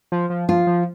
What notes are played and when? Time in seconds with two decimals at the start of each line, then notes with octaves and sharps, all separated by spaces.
0.12 F3
0.30 F3
0.49 F3 F4
0.67 F3